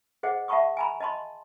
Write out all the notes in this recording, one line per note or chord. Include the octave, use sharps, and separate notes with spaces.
G#4 C5 D#5 F#5
E5 F#5 A5 B5 C#6 D#6
G#5 A#5 B5
D#5 A5 B5 C6